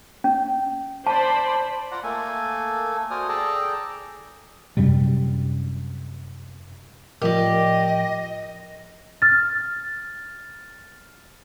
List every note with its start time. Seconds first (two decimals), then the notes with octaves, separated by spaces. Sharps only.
0.24 C#4
1.07 C5 D5 A5 B5
1.91 F4 D5 F#5 A#5
2.03 A3 A#3 A4 G#5
3.11 F#4 C5 D5 G#5 D#6 F6
3.29 G#4 A4 D5 G5 A5 A#5
4.77 F#2 C3 F#3 G3
7.22 A2 F3 G4 A#4 D5 D#5
9.22 F6 A6